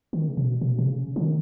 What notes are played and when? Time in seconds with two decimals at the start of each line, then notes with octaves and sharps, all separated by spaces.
0.13 D#3
0.28 C#3
0.37 B2
0.61 B2
0.79 B2
0.86 C#3
1.16 F3
1.22 D#3